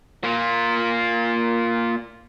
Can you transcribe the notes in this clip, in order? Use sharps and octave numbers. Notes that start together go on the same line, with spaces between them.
A#3 F4